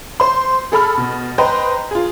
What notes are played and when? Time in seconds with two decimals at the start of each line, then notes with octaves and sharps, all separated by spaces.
0.20 C5 C6
0.72 G#4 A4 B5 F6
0.98 B2
1.38 B4 C5 D#5 G5 A#5
1.91 F4 G#4